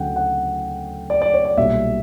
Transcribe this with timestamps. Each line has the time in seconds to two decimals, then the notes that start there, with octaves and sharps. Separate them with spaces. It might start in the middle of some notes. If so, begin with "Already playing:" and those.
Already playing: D2 C#3 F#3 F#5 G5
0.16 F#5
1.10 D5
1.22 D5
1.34 C#5
1.45 D5
1.57 B1 A#2 G3 E5